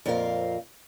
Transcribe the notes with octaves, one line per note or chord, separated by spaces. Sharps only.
F2 A#2 C4 F4 A#4 F5